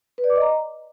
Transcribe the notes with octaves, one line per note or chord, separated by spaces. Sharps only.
B4
D5
D6
D#5
A#5